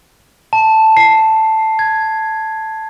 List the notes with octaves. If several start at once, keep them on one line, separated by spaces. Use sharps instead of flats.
A5
C7
G#6